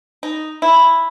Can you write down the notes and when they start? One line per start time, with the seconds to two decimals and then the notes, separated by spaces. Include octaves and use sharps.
0.23 D#4
0.62 E4